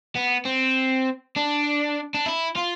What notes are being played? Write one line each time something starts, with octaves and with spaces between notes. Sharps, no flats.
B3
C4
D4
D4
E4
F4